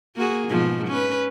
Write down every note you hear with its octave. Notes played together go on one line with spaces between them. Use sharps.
A#3 F#4 G#4
G#2 B2 F3
C#4 B4